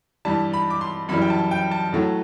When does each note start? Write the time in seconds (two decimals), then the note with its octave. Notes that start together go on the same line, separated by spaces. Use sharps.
0.25 G2 E3 G3 A5
0.53 B5
0.70 D6
0.81 C6
1.09 F#2 E3 G3 B5
1.21 G5
1.30 A5
1.51 G5
1.71 A5
1.93 A2 F#3 A3